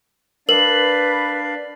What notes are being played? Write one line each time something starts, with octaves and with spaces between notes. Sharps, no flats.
D4 A#4 B4 D5 F5 F#7